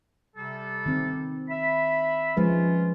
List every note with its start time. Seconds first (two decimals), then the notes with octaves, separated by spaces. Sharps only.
0.36 C3 G3 A4
0.86 D#3 C4
1.49 E5 B5
2.37 F3 G#3 C#4 F4 B4